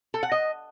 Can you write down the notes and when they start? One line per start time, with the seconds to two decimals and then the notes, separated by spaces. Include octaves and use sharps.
0.14 A4
0.23 F#5
0.32 D#5